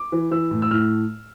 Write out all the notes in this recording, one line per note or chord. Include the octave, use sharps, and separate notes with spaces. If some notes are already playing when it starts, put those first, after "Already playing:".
Already playing: D6
E3
E3 E6
A2
E6
A2 F6